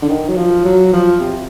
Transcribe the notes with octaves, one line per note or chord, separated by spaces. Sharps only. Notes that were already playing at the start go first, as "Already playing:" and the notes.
D3
D#3
F#3
F3
F#3
F3
C3